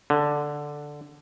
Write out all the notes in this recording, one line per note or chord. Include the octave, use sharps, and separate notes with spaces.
D3